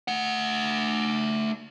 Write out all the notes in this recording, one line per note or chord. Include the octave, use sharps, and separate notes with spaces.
A3 F#5